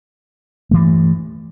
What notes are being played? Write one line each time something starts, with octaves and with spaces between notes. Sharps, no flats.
G2 E3 A3